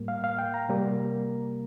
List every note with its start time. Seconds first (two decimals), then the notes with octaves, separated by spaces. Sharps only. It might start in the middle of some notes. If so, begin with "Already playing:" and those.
Already playing: A2 G3 A#3
0.08 F5
0.24 F5
0.39 G5
0.54 A#5
0.69 C3 G3 A#3